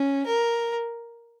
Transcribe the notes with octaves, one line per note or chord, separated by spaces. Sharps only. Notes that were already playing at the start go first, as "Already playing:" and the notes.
Already playing: C#4
A#4